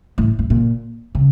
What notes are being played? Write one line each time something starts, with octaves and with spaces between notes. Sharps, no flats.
A2
A2
A#2
C#3